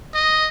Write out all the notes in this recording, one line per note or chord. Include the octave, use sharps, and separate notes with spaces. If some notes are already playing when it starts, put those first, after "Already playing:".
D#5